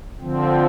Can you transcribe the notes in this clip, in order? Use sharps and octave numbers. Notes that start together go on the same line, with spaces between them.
D3 F3 C4